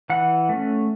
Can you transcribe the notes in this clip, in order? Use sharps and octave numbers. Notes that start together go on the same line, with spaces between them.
E3 F#5
A3 C#4